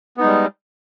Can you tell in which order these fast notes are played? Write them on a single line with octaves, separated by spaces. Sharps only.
B3 D#4 G#3 G3